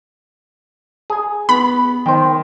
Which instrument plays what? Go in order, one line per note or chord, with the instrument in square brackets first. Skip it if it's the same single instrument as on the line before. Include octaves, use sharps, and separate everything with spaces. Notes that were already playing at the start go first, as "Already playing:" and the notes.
[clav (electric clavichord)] G#4 G#5
[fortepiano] B3 [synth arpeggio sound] B5
[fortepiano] D#3 [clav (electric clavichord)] C5 G5